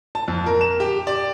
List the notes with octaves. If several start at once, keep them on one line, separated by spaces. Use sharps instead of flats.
A5
F2
A#4
E7
G4
D5